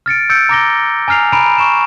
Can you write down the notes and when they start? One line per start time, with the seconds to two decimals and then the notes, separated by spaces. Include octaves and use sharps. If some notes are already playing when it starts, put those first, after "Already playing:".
0.06 F6 A6 C#7 D7
0.30 E6 G6 A6 C#7 D7
0.49 A#5 D6 A#6 G7
1.08 G#5 A#5 F6 C7 F7
1.32 A#5 B5 D7 D#7 F7
1.58 C#6 E7